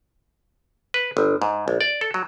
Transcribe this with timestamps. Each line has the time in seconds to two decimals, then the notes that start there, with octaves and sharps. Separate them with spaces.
0.94 B4
1.17 G1
1.42 G#2
1.68 A#1
1.81 D5
2.01 A4
2.14 F#3